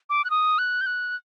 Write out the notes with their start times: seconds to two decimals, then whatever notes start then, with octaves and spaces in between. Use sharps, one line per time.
0.10 D6
0.25 F#6
0.30 D#6
0.58 F#6
0.81 G6
0.86 F#6